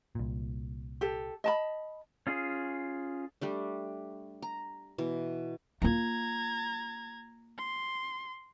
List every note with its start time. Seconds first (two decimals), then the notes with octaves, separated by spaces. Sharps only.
0.15 C2 A#2
1.01 G4 A4
1.44 D#5 A5 B5
2.27 C#4 F4 G#4
3.41 G3 A3 D4
4.42 A#5
4.98 B2 E3
5.82 A#3 F4 A#5 G#6
7.58 C6